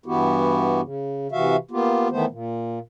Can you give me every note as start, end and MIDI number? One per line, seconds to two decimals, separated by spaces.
0.06 0.81 43
0.06 0.81 52
0.06 0.81 59
0.06 0.81 64
0.06 0.81 66
0.06 0.81 67
0.82 1.27 49
1.32 1.56 48
1.32 1.56 52
1.32 1.56 66
1.32 1.56 76
1.32 1.56 77
1.71 2.08 58
1.71 2.08 59
1.71 2.08 65
1.71 2.08 67
2.11 2.25 51
2.11 2.25 52
2.11 2.25 57
2.11 2.25 59
2.11 2.25 72
2.30 2.79 46